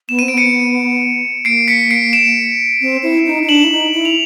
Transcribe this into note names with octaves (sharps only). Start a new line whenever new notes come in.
B3 E7
C4 D#7
D7
B3 C#7 D#7
A#3 C7 D7
B6 C#7
C7 D7
D7 E7
C4
E4
D#4
D#4
D4 E7 F#7
E4
D#4
E4
F7